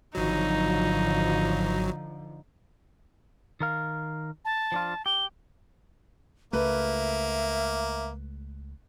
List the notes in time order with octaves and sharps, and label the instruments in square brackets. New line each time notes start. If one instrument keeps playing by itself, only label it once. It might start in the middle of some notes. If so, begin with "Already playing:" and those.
[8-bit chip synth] G#1 F#3 [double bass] D3 F3 [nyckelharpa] D#4
[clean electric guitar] D#3 A#4 F5
[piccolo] A5
[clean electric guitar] F3 D4 F4
[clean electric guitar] G4 [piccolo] G7
[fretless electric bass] C#2 A3 [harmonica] A#3 [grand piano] B4 [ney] E5